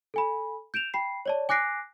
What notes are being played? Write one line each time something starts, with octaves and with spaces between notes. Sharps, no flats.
A4 G#5 B5
G6 D7 E7 F7
G5 B5 C7
C#5 D5 A5
G#5 D6 F#6 A#6 C7 D7